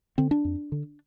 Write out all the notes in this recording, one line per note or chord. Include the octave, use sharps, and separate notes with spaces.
D3 C4
D4
F2
D3